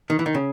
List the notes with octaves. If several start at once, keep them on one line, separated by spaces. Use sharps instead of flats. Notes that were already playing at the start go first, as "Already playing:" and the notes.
D#3
E3
D#3
C#3